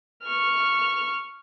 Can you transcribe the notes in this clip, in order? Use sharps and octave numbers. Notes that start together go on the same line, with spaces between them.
C#6 F6